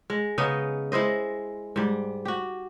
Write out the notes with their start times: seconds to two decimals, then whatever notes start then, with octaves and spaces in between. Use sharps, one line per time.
0.10 G#3
0.38 C#3 B3 D#4 D#5
0.92 G#3 E4 C5 D#5
1.76 G#2 G3
2.25 F#4 G4